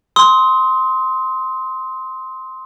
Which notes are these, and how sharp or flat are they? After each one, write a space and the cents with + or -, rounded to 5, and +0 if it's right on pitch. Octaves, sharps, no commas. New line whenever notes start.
C6 +0 D#6 +35